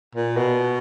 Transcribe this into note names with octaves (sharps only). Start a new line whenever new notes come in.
A#2
B2